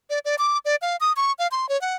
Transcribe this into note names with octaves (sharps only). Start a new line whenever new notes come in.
D5
D5
D6
D5
F5
D#6
C#6
F5
C6
C#5
F#5